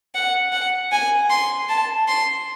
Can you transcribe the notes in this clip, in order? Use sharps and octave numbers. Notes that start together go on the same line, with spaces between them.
F#5
F#5
G#5
C6
A5
C6